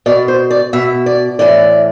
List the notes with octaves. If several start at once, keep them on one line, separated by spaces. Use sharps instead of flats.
B2 D5
C5
D5
B2 E5
D5
A2 E3 D5